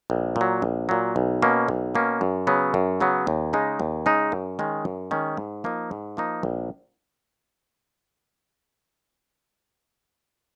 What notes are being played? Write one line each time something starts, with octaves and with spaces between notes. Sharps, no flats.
A#1
A#2
F#3
A#1
A#2 F#3
B1
B2 A#3 C#4
B1
B2 A#3 C#4
F#2
C#3 F#3 B3
F#2
C#3 F#3 B3
D#2
C#3 G#3 D#4
D#2
C#3 G#3 D#4
F#2
D#3 G#3 C#4
F#2
D#3 G#3 C#4
G#2
F3 A#3 D#4
G#2
F3 A#3 D#4
A#1